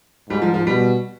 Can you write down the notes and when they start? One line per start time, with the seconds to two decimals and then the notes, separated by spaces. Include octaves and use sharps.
0.29 G#2 G3
0.42 F3
0.54 F3
0.67 B2 G3